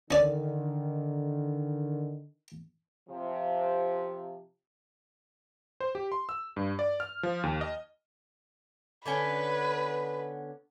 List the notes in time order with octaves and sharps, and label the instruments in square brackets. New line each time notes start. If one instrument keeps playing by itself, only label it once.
[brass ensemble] D3 D#3 [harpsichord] C#4 D5
[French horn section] C3 F3
[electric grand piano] C5
G4
C6
E6
G2
D5
F6
F3
D#2
D#5
[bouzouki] D3 B3 C#4 [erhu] B4